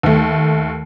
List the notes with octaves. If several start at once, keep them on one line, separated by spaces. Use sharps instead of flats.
D#2 A3